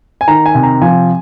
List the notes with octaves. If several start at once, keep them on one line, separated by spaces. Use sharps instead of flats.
G#5
D#3 A#5
G#5
C3
A#5
F3 G#5